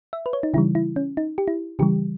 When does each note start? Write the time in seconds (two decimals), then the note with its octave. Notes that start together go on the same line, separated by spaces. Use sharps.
0.13 E5
0.26 B4
0.33 C#5
0.43 D#4
0.54 C#3 E3 G3 E4
0.75 E4
0.96 C#4
1.17 D#4
1.38 G4
1.48 E4
1.79 C#3 E3 G3 G4